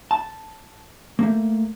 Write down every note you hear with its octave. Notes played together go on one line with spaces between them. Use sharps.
A5
A3 A#3